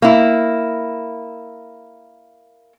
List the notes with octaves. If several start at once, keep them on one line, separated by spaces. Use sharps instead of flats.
A#3 E4